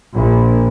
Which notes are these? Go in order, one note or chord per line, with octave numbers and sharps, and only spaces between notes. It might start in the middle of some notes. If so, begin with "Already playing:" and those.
A#1